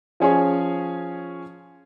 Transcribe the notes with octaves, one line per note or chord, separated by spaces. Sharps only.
F3 C#4 G#4 C#5